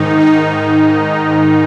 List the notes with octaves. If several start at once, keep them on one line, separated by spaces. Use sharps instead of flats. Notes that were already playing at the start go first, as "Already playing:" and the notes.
Already playing: G#2 D#3 D#4
D#4